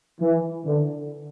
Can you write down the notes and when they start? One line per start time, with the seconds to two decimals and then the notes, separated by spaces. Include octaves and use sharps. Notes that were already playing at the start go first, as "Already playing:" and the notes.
0.21 E3
0.65 D3